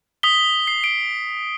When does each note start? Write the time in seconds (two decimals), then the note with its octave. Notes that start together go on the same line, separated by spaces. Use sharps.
0.23 D#6 B6 G7
0.67 C7
0.84 D7